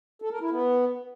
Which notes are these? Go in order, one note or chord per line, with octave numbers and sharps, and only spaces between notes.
A4
A#4
E4
B3